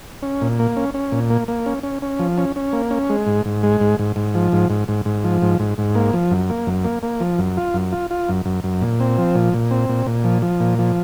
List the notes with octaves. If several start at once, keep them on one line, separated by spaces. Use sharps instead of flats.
C#4
A#2
A#3
C#4
C#4
A#2
A#3
A#3
C#4
C#4
C#4
F3
C#4
C#4
A#3
C#4
G#3
G#2
G#2
G#3
G#2
G#2
G#2
F3
G#2
G#2
G#2
G#2
F3
G#2
G#2
G#2
A#3
F3
F#2
A#3
F#2
A#3
A#3
F3
F#2
F4
F#2
F4
F4
F#2
F#2
F#2
A#2
C4
F3
A#2
A#2
C4
A#2
A#2
F3
F3
A#2
F3